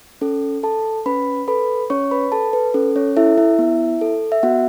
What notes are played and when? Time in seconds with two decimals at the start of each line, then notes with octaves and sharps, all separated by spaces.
0.21 C#4 A4
0.63 A4 A5
1.06 C#4 B4 B5
1.48 A4 B4 B5
1.90 C#4 C#5 C#6
2.11 B4 B5
2.32 A4 A5
2.53 B4
2.74 C#4 A4
2.96 C#4 C#5
3.16 E4 A4 E5
3.38 E4 E5
3.59 B3
4.01 A4
4.32 E5
4.43 B3 F#4 F#5